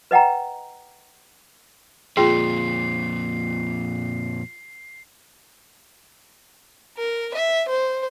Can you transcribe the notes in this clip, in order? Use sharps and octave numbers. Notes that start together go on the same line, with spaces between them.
B4 D#5 F#5 G5 A#5
F2 A#2 F4 G#4 G5 C6 C7
A#4
E5
C5